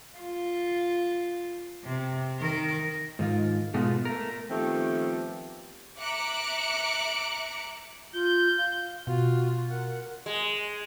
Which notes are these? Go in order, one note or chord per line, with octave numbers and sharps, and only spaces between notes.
F4
C3
D#3 A#4
G#2 D#3 F4
G#2 B2 G#3 A3 B3 F4
A3 A#4
D#3 F3 A3 B3 C4 G4
E5 A#5 D6 F#6 C#7 D7
F4 G6
F5
B2 F4 F#4
A#4 F#5
G#3